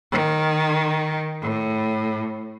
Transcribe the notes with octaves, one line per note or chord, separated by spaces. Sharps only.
D#3
A2